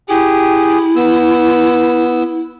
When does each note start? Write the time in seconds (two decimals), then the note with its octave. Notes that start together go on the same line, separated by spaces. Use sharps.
0.09 E4 G4 G#4
0.96 B3 E6